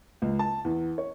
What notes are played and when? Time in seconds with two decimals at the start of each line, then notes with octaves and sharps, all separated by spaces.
0.22 C#2
0.39 A5
0.65 E2
0.98 C#5